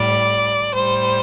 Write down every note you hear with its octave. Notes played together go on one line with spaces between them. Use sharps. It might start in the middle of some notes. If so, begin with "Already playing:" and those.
Already playing: A2 G3 D5
A2 G3 C5